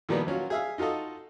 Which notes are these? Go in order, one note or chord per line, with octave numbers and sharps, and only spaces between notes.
A#2 D#3 F3 G3 A#3 B3
F#3 C#4 F4 F#4
G#4 E5 F5
D#4 F4 F#4 A4 D#5